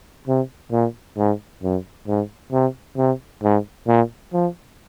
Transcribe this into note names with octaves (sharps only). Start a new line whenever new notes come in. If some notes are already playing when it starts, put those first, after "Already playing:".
C3
A#2
G#2
F#2
G#2
C3
C3
G#2
A#2
F3